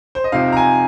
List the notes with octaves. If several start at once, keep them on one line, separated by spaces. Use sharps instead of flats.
C5
D#5
F2 C3 F3 C4 D#4 F5
A#5
G#5